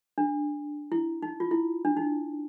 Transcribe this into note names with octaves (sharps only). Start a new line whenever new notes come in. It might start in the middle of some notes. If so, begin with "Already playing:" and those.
D4
E4
D#4
F4
E4
D4
D#4